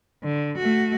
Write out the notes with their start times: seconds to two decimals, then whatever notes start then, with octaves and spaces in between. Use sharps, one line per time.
0.23 D3
0.58 A3 F#4